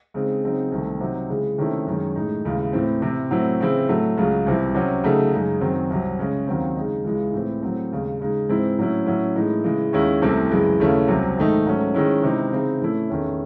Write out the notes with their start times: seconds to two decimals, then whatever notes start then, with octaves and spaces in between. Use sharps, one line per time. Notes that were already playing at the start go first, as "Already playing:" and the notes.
0.14 C#3 G#3 C4 D#4
0.43 C#3 F#3 C4 D#4
0.72 C2 C3 D#3 A3
1.00 C3 F#3 C4 D#4
1.29 C#3 E3 G#3
1.58 C3 D#3 A3 C#4 E4
1.87 F#2 D#3 G#3 C#4
2.16 A2 G#3 D#4
2.45 D#2 C#3 E3 G#3
2.73 A2 E3 C4
3.02 C3 E3 C4
3.31 A2 F#3 C4 E4
3.60 C#3 E3 C4 E4
3.89 A2 F#3 A3
4.17 C#2 C#3 F#3
4.46 C2 C3 E3
4.75 C3 F#3 C#4
5.04 C#3 F#3 A3 D#4
5.33 F#2 C#3 G#3 D#4
5.61 F#2 D#3 F#3 C4
5.90 C2 C3 F#3
6.19 C#3 G#3 C#4
6.48 D#2 D#3 F#3 C4
6.76 C#3 G#3 D#4
7.05 C#2 C#3 E3 G#3
7.33 A2 E3 C4
7.63 A2 F#3 C4
7.92 D#2 C#3 G#3
8.20 C#3 G#3 D#4
8.49 G#2 E3 C4 E4
8.78 A2 F#3 C#4 E4
9.06 A2 F#3 C#4 E4
9.36 A2 E3 G#3 D#4
9.64 C#3 E3 G#3
9.93 D#2 D#3 G#3 C#4 E4
10.22 C2 C3 E3 A3 C4
10.50 F#2 C#3 E3 G#3
10.80 D#2 C#3 E3 A3 C#4
11.08 C2 C3 F#3
11.37 G#2 D#3 A3 D#4
11.65 G#2 F#3 A3 C#4
11.94 G#2 D#3 G#3 C#4 E4
12.23 C3 E3 G#3 D#4
12.53 C#3 E3 C4 D#4
12.81 A2 E3 A3 C#4 E4
13.10 E2 D#3 A3 C#4